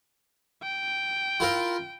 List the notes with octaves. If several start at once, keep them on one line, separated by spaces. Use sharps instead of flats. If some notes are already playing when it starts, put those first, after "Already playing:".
G5
E4 F4 A#4